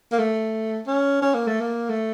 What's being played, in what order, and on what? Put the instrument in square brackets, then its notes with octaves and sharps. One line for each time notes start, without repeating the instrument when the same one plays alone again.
[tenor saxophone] A#3
A3
C#4
C#4
A#3
A3
A#3
A3